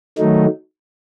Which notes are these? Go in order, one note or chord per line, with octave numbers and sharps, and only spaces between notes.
D#3 F#3 A3 D#4